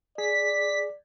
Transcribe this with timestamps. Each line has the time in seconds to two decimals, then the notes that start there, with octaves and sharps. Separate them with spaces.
0.18 G#4 D5 B6